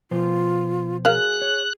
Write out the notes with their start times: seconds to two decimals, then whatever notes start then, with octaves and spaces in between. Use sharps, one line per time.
0.11 B2 F3 F4 C5
1.05 F#3 G#4 A#4 F5 F#6
1.42 C#5